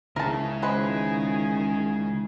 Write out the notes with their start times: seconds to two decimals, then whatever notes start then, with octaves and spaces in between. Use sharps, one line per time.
0.16 C#2 C#3 E4 A#4 A5
0.62 D#3 F3 G#3 G#4 B4